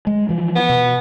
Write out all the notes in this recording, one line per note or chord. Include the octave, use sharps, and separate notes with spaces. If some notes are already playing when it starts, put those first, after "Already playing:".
G#3
E3 F3
B3
B2